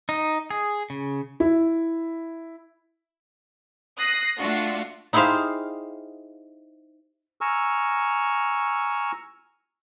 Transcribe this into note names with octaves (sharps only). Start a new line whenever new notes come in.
D#4
G#4
C#3
E4
D#6 F#6 A#6 C7
A3 D4 F4 F#4
D#4 E4 G4 G#4 C5 F5
G#5 A#5 C#6 E6 F6